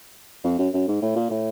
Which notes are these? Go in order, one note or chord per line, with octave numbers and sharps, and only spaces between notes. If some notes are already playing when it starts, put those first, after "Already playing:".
F2
F#2
F#2
G#2
A2
A#2
A2